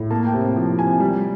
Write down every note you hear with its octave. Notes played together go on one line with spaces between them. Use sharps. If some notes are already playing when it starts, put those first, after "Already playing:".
Already playing: A2
A#3 A5
G5
C3
F3
C3 G#5
G3